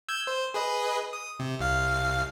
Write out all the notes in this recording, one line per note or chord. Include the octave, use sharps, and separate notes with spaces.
E6 G6 G#6
C5
G#4 B4 D#5
D#6
C3
C2 F5